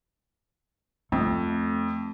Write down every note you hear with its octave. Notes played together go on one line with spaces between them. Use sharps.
F2 A3